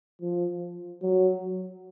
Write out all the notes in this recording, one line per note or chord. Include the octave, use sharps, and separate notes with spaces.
F3
F#3